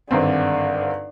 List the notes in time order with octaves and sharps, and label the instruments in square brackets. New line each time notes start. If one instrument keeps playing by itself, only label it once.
[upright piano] G#1 G2 C4 [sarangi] D3